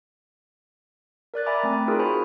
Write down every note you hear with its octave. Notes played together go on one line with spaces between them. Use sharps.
A#4 D5 F#6 A6
E5 G#5 A#5 B5 D6
A3 C4 G#5
D#4 F4 G#4 A#4 F#6
F#4 C5 G#5 B5